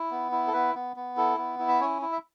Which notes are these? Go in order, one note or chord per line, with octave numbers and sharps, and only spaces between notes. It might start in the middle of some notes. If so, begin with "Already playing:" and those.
Already playing: E4
B3
E4
A4
B3 B4
B3
B3
E4 A4
B3
E4
E5
C#4 C#5
E4
E5